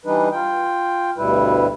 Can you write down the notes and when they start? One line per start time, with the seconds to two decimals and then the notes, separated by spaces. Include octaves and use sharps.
0.05 E3 G3 D4 D#4 B4
0.33 F4 G5
1.18 D2 G2 B2 G3 E4 B4